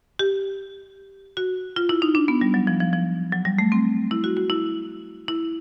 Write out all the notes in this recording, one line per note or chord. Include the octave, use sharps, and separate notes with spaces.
G4
F#4
F4
E4
D#4
D4
B3
G3
F#3
F3
F3
F3
F#3
G3
A3
C4
E4
F#4
F#4
E4
E4